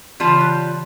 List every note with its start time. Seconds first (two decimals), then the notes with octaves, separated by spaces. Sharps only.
0.20 C#3 E3 G3 F4 A5
0.41 F#6